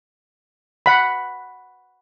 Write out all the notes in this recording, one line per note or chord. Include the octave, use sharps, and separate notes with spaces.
F#5 B5